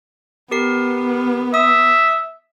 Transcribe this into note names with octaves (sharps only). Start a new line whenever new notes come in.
B3 G4 A#4 C7
E5 D#6